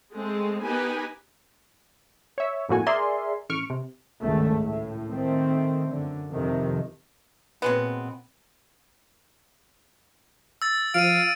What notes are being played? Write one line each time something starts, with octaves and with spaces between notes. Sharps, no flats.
G#3 A3 C4
B3 D#4 G4 A#4 B4 G#5
C#5 E5
G1 F2 A2 A#3 F#4 G#5
G#4 A#4 D5 E5 C6
A1 C#6 F6 D7
C3
G#1 C#2 G2 D#3 A3
A2
D#3 A3 C4
F#2 D3
F2 C3 D#3
A#2 F#3 G#3 B3 C4
E6 A6
F3 F5 D7 D#7